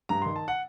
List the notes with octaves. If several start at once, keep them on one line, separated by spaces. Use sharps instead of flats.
G2 A#5
D#3 C6
A5
F#5